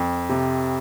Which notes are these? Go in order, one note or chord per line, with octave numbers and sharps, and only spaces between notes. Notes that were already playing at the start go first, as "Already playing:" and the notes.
Already playing: F2
C3